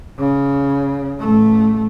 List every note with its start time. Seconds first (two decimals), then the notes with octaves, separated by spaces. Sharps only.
0.19 C#3
1.20 A1 A3